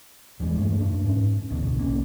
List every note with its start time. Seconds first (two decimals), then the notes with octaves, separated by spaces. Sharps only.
0.40 D1 E2 E3 G#3
0.58 G2 A3 A#3 D4
0.80 F#2 D4
1.04 G#2 C#4
1.50 A1 D2 B2 D3
1.77 B1 A#3 C#4